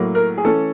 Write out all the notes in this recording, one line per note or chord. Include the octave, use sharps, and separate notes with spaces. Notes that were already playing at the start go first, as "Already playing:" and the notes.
Already playing: A2 F#3 A#3
A#4
G#4
E3 A3 C#4 A4